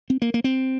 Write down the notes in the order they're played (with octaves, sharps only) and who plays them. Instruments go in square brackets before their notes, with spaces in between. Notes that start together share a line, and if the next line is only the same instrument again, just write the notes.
[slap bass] C4
A#3
A#3
C4